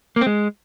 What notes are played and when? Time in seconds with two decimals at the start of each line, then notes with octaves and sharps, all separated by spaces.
0.16 A#3
0.21 C4
0.26 G#3